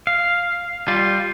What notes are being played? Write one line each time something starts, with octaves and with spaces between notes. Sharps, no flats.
F5
G3 F4